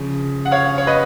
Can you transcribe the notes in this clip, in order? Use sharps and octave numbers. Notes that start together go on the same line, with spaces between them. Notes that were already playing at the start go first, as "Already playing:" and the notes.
Already playing: C#3 F3
F#5
C#5 F5
C#5
B4 D#5